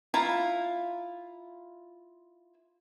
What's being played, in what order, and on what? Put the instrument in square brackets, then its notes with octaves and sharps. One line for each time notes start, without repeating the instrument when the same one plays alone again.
[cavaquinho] E4 F4 F5 A#5